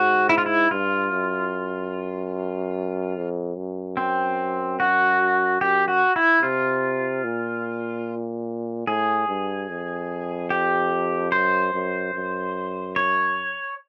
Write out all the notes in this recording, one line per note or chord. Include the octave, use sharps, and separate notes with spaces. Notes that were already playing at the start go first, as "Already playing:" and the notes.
Already playing: G#2 F#4
E4
F4
E4
G2 F4
F#2
F2
F#2
C4
F#4
F#2 G4
F#4
E4
C3 F4
A#2
A2 G#4
G2
F2
G4
F#2 C5
F#2
F#2
C#5